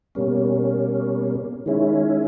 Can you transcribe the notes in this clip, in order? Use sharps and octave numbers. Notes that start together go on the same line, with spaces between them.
B2 G3 A#3 C#4
D#3 G#3 C#4 E4